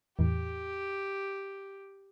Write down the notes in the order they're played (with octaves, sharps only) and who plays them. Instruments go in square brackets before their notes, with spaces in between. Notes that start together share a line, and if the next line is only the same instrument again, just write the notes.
[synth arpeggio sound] E2 A2 E3 [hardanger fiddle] G4